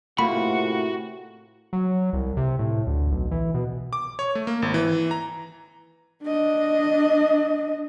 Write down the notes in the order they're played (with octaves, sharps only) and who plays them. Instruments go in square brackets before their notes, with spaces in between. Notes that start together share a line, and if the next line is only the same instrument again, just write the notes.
[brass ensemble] A2 C3 [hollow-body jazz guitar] A3 A#3 F4 [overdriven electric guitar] F#4 [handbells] B5
[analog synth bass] F#3
C2
C3
A2
D2
B1
E3
B2
[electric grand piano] D6
C#5
A3
A#3
G#1
E3
A#5
[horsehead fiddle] D4 D#5